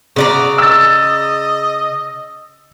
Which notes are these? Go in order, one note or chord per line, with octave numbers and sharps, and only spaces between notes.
C#3 F#4 D5 A#5
D#5 E6 A6